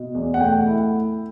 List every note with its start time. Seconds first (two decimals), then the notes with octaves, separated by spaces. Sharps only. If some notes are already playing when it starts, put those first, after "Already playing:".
Already playing: B2
0.15 E2
0.34 F#5
0.39 A3 G5
0.66 E4